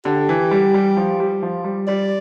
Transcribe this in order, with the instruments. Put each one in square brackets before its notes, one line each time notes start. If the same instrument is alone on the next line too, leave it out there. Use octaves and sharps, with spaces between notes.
[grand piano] D3 [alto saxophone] G4
[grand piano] E3
G3
G3
F3
G3
F3
G3
[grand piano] G3 [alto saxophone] D5